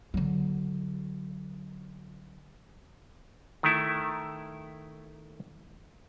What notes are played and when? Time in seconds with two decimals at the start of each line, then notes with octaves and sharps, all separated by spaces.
0.14 D3 F#3
3.63 D#3 A3 E4